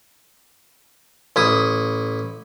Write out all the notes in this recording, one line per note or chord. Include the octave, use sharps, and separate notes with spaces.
A1 E4 D#6